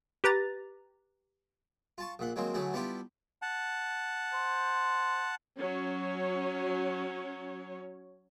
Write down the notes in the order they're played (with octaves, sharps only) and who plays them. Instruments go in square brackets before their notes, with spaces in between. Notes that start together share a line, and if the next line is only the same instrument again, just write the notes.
[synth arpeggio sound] G4 B4 A#5 A6
[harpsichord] F4 A5 C#6
A#1 A#2 F#5
D#3 F#3 G#3 A#3 C4
D3 E3 F#3 A3 G#4
G3 B3 D4 E4 F4 G4
[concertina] F#5 A5
[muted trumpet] C5
[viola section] F#3 C#4 C#5